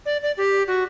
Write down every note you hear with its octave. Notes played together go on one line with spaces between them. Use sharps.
D5
D5
G4
F#4